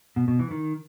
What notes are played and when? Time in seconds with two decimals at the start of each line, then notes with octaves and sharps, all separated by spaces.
0.16 B2
0.28 B2
0.39 E3
0.51 D#3